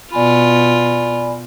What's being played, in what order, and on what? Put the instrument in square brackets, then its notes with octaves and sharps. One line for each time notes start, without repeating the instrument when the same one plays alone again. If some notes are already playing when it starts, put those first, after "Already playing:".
[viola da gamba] B2 F4 [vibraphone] D5 G#5 B5